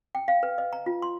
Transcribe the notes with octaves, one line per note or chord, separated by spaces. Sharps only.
G5
F5
B4
D#5
A#5
F4
C6